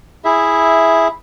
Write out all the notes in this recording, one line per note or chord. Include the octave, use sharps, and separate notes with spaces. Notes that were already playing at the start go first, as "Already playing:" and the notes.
E4 G#4 E5